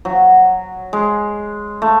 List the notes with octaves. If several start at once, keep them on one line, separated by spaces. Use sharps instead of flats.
F#3
G#3
A3